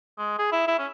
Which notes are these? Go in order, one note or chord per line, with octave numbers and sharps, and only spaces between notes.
G#3
G#4
E4
E4
C#4